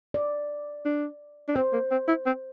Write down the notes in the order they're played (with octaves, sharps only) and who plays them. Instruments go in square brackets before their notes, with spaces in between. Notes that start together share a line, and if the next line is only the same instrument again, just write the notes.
[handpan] D5
[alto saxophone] D4
D4
[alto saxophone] C4 [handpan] C5
[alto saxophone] A#3
C4
E4
C4